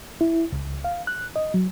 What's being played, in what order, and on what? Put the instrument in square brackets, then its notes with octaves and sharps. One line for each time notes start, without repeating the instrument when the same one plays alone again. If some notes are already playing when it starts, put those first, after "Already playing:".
[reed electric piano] E4
C#2
F5
F#6
D#5
F#3